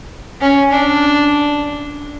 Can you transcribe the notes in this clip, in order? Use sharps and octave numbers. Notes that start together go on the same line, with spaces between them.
C#4
D4